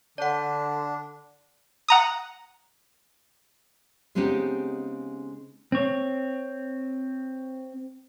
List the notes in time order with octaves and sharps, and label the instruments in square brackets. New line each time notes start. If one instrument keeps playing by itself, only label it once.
[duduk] D3 [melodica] D4 [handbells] D5 F#5
[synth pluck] F#5 A#5 D#6
[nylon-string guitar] C#3 G#3 B3 C4 D#4 G4
[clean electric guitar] C4 C#5